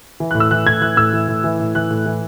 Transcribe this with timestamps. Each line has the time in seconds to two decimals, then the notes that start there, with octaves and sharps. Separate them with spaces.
0.20 E3
0.31 A2 F#6
0.40 E6
0.51 E3 F#6
0.66 A2 G#6
0.81 E3 F#6
0.97 A2 E6
1.13 E3
1.28 A2
1.44 E3
1.60 A2
1.75 E3 F#6
1.91 A2
2.06 E3